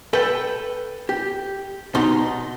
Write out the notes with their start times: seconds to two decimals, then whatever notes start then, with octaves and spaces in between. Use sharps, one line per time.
0.13 A4 B4 G5
1.09 G4
1.95 B2 D#4 C6